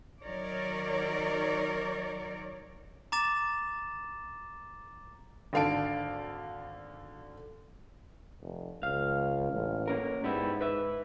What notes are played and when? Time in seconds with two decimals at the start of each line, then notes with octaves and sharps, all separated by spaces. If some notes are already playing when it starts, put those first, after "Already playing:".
0.22 D#3 F#3 D#4 A#4 C#5 D5
3.12 A#5 D6 A6 E7
5.53 G#1 D3 F5 A5 D7
8.42 F1
8.83 C#2 F5
9.53 A1
9.88 A#3 C#4 A#4
10.24 G#2 G3 B3 E4
10.61 B4 E5